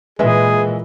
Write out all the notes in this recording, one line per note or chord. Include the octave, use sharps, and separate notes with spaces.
A#2 E3 G#3 G#4 B4 E5